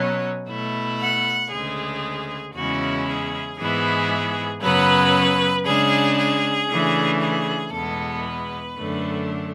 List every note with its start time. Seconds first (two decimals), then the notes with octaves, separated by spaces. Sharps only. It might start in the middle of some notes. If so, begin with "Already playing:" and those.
Already playing: B2 F#3 C#4
0.48 B2 A3 E4
1.00 F#5
1.51 D2 C#3 G#3 G#4
2.54 E2 C#3 G#3 C#4 E4 F#4
3.06 G#4
3.58 G#2 E3 G#3 B3 E4 G#4
4.61 F#2 C#3 F#3 B3 B4
5.65 C#3 G#3 D4 G#4
6.17 G#4
6.68 C#3 E3 A3 D4
7.21 G#4
7.72 E2 B2 G#3 B3 A4
8.24 B4
8.76 F#2 D3 A3 D4